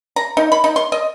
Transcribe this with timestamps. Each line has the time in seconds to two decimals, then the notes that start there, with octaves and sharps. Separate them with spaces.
0.16 A#5
0.37 D#4
0.52 B5
0.64 D#4
0.76 C6
0.92 D#5